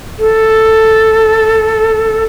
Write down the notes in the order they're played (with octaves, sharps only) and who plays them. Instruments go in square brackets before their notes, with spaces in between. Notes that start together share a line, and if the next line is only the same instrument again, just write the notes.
[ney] A4